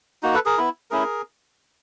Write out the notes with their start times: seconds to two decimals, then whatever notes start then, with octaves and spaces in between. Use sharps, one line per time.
0.23 A#3 D#4 F#4
0.34 A4 B4
0.46 G#4 A#4
0.58 B3 E4
0.91 A3 C#4 E4 G#4 A#4